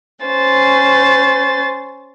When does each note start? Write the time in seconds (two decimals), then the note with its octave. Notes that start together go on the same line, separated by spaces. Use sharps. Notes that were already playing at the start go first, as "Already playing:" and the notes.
0.24 C#4 C5 A6